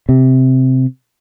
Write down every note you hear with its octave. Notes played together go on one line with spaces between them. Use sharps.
C3